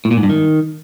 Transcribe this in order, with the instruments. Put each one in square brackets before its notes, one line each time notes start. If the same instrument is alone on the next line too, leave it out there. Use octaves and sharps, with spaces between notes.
[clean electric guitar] A2
A#2
G#2
G2
D#3